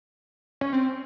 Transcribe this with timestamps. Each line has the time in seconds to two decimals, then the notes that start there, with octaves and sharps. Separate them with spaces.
0.61 C#4
0.73 C4